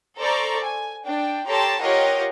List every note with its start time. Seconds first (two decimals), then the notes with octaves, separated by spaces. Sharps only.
0.19 A4 C5 D5 A#5 C#6
0.64 G#5
1.05 D4 G5
1.46 G4 A4 C#5 A5 A#5 C6
1.81 F4 G4 A#4 C#5 D#5 F#5